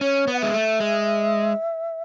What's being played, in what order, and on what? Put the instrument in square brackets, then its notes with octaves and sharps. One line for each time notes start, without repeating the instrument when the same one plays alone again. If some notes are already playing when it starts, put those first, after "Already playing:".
[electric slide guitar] C#4 [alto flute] C#5
[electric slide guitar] B3
[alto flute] F#5
[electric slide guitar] G#3 [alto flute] E5
[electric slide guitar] A3
G#3